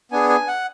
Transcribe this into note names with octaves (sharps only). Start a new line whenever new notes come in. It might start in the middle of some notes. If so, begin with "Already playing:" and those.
B3 D4 G#4 G#5
G#5
F#5